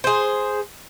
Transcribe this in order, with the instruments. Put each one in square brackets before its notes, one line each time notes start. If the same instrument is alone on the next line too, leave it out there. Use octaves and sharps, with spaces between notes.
[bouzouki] G#4 C5